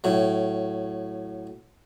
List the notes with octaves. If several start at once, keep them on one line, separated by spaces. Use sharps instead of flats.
A2 F#3